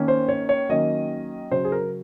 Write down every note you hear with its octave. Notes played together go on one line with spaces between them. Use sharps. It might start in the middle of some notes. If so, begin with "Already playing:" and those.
Already playing: D#3 A#3 C#4
C5
C#5
C#5
D#3 F#3 A#3 C#4 D#5
C#3 F#3 C#4 C5
G#4
A#4